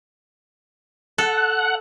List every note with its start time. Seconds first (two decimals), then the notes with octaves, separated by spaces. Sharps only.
1.18 A4 F#5 F#6